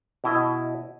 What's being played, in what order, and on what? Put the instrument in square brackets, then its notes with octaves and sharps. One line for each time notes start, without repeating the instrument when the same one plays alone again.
[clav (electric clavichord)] B2 E4 D#5